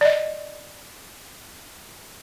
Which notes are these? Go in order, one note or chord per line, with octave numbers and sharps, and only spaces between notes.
D5 D#5